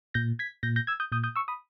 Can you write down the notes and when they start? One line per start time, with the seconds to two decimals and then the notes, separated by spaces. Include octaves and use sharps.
0.14 A#2 G6 A#6
0.39 G#6 B6
0.63 A#2 G6 A#6
0.76 G6 A#6
0.87 E6 G#6
1.00 D#6 G6
1.12 A#2 D#6 G6
1.24 D#6 G6
1.36 C#6 E6
1.48 B5 D#6